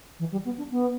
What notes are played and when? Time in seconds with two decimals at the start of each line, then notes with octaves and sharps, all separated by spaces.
0.19 E3
0.32 G3
0.45 B3
0.58 D4
0.71 B3